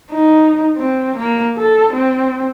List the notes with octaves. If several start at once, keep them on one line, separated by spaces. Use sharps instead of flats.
D#4
C4
A#3
A4
C4